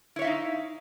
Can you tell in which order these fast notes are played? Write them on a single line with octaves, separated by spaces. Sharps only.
E4 C#5 E5 F5 D#4